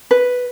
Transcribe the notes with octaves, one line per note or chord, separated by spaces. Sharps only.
B4